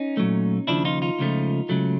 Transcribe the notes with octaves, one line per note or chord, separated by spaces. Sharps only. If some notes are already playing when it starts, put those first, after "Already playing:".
Already playing: C#4 D#4
A#2 F#3 A3
D#2 C#3 F3 D4 E4
D#4 F4
D#4 F4
C#2 C#3 F3 A3
C#2 C#3 F#3 A3